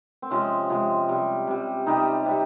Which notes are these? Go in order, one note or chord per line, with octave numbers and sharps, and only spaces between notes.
C4
C3 F3 G#3 C#4
C3 F3 G#3
C3 G3
C3 G3
C3 G3 D#4
C3 G3